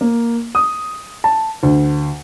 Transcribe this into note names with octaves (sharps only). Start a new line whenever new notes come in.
A#3
D#6
A5
D2